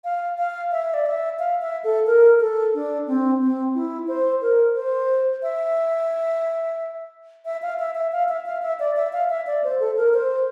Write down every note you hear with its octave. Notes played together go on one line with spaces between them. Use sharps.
F5
F5
E5
D5
E5
F5
E5
A4
A#4
A4
D4
C4
C4
E4
C5
A#4
C5
E5
E5
F5
E5
E5
F5
E5
F5
E5
D5
E5
F5
E5
D5
C5
A4
A#4
C5